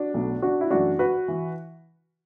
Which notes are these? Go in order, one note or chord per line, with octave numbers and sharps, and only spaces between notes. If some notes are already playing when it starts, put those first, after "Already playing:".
Already playing: D4 F#4
B1 B2 F#3 A3
D4 F#4
E4
F#2 E3 A3 D4 F#4
F#4 B4
E3